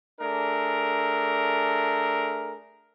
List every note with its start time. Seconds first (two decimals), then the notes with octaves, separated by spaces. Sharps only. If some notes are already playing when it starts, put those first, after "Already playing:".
0.20 A3 D4 G#4 A#4